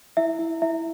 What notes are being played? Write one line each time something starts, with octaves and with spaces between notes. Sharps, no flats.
E4 E5
E4
E4 E5